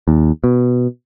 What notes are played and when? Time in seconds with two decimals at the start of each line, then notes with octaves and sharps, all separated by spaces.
0.08 D#2
0.44 B2